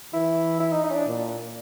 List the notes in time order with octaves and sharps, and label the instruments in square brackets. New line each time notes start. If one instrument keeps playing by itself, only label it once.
[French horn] E3 [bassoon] E4
[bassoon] E4
D#4
D#4
C#4
D4
[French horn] A#2